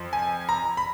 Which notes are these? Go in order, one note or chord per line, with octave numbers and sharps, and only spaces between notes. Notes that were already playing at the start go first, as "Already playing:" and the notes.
Already playing: F2 F3
G#5
A#5
B5